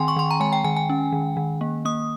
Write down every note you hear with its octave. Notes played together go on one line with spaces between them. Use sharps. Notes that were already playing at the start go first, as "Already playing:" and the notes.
Already playing: D#3 C4 G5 G#5 C6
C#6
D#3 C6
A#5
G#3 G#5
G5
D#3 G#5
G#5
C#4
D#3
D#3
A#3
A#3 D#6